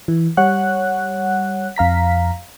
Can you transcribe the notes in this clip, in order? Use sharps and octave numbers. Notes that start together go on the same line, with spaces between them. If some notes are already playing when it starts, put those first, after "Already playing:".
E3
G3 C#5 F#5 F#6
F2 F5 A#5 B6